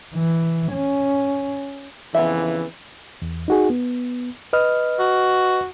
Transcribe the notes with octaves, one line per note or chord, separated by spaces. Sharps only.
E3
C#4
F2 C#3 E3 B3 E5
E2
D#4 F#4 G#4
B3
B4 D#5 F6
F#4